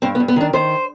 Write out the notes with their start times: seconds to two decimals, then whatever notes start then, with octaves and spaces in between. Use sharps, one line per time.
0.02 G2 C4
0.15 B3
0.20 G2
0.28 B3
0.36 D#3 D4
0.53 D#3 C5